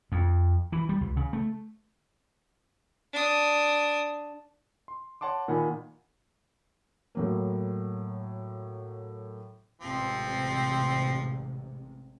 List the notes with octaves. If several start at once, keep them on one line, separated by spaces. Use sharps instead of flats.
F2
E3
G3
C#2
C#3
A3
D4 D#6
C6
C#5 F#5 A5 C6 D6
A#2 D#3 F#5 G#5 B5
A2 F#3 A#3
A1 G#2 C3 F3 C4